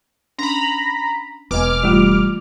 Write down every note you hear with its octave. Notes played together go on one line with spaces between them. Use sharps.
C#4 D4 A#5 B5
E1 A#3 B3 D#5 G#5 D6 F6
G2 E3 G3 A3 F4